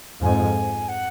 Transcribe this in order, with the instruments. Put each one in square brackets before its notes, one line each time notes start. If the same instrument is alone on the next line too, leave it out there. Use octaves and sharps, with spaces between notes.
[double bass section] F2 G#2 [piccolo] G#5
[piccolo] F#5